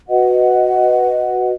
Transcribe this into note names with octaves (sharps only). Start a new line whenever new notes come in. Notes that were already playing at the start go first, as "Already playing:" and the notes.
F#4 B4 D#5 F#5